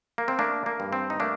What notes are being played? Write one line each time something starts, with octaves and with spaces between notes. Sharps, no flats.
A#3
C4
A3 A#3 D4
A#3
G2
C4
D#4
A3 A#3 D4